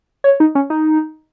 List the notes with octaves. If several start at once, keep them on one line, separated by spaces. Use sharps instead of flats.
C#5
D#4
C#4
D#4